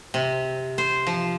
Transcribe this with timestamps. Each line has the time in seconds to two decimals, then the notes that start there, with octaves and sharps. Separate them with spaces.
0.14 C3
0.78 C5
1.07 F3